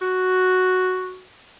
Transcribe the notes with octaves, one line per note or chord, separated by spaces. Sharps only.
F#4